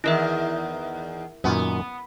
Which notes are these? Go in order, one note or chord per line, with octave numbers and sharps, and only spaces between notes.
E2 G2 D#3 E4 A#4 E5
F#2 A#2 D#3 B3